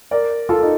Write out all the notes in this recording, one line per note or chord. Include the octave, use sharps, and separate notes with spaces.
A#4 D5
F4 A4
D#4